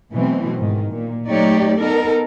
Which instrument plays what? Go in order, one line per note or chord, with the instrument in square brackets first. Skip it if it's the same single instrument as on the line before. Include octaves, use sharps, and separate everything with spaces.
[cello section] B2 E3 F#3 A3 C4
G#2 D#3
A#2
F#3 A3 D#4 G4 C#5 D5
B3 D#4 A4 A#4